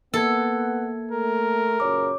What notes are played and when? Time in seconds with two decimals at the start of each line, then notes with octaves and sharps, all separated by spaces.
0.14 A#3 B3 A4 F#5 G#6
1.12 A3 A#4
1.80 F#2 A#2 C#3 C#5 D6